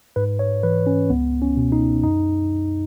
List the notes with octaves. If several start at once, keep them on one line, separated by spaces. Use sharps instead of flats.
G#2 B4
C#5
E3 B4
C#4
C#2 B3
C#4
B2
D#4
F#2 D#4